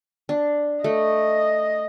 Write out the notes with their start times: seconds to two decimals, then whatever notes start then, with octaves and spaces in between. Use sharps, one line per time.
0.29 D4
0.84 A3 D#5